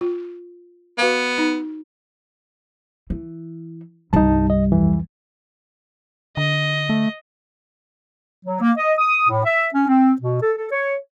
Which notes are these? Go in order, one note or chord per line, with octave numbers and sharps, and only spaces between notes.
F4
B3 F#4 B4 F5
D#4
E3
C2 G2 D#4 A5
D#5
F2 E3
D3 D#5
A3
F#3
A#3
D#5
D#6
A2
E5
C#4
C4
B2
A4
A4
C#5